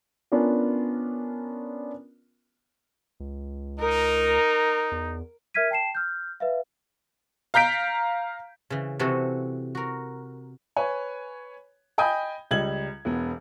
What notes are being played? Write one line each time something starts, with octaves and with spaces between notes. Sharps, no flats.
B3 C#4 D4 F4 A#4
C#2
D#4 A#4
E2
A#4 E5 F6 G#6 B6 D#7
G5 A5 C7 E7
F6 G6
B4 E5 F5
F5 A#5 G6 B6 D7
C#3 E3
C3 E3 F#4 A4
F#4 A#4
B4 C#5 G#5
D#5 G5 G#5 B5 D#6 G6
C#2 G3 G#6 F#7
E1 B3